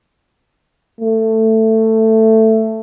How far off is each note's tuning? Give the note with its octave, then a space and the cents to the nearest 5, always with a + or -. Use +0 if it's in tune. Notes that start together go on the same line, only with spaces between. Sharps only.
A3 +10